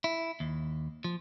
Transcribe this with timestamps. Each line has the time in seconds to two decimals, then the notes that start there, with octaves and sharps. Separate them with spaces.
0.04 E4
0.40 D#2
1.04 F3